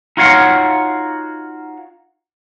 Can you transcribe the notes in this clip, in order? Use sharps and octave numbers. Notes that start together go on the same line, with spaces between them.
D#4 F4 F#4 C#5 F5 F#5